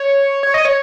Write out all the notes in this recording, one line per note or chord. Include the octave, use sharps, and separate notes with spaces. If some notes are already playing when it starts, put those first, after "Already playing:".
Already playing: C#5
C#5
D#5
C#5